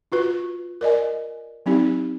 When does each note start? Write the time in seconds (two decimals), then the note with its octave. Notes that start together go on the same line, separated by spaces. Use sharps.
0.12 F4 F#4 B4
0.81 A#4 D5 D#5 G#5
1.66 F#3 C4 D#4 G4